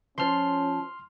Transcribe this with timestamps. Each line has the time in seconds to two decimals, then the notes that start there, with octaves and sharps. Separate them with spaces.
0.18 F3 C#4 C6 F6